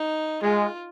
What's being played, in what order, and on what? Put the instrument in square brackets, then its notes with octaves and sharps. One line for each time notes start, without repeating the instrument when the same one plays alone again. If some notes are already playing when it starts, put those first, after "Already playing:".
Already playing: [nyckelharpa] D#4
[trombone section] G#3 [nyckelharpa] F4